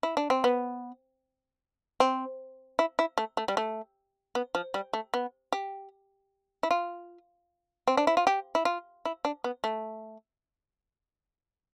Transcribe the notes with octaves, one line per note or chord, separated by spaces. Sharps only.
E4
D4
C4
B3
C4
E4
E4
A3
A3
G3
A3
B3
F3
G3
A3
B3
G4
E4
F4
C4
D4
E4
F4
G4
E4
F4
E4
D4
B3
A3